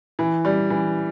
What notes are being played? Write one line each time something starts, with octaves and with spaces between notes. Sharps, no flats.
E3
G3
E3